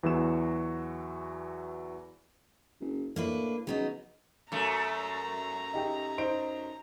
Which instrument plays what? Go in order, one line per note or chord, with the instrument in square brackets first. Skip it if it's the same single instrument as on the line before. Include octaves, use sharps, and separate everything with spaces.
[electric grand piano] E2 E3 F#3 F#4 E7
[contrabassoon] F#1
[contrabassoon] A2 [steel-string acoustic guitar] A#3 D4 B4
[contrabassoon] C#3 [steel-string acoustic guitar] F#3 B3 D#4
[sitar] F#2 A3 [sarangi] A#5
[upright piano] D#4 G4 G5
D#4 C5 D7